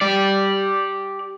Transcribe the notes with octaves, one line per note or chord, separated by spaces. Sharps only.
G4 D5